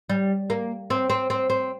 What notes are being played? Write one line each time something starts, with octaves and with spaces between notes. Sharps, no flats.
G3
A#3
C4
C4
C4
C4